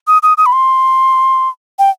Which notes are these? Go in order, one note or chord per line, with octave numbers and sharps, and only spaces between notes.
D#6
D#6
D#6
B5
C6
G5